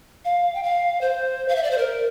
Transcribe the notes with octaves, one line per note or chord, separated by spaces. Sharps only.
F5
G5
F5
C5
F5
E5
D5
C5
A#4